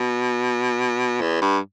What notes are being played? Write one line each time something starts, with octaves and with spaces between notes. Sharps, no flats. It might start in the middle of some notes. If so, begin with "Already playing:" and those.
Already playing: B2
E2
G2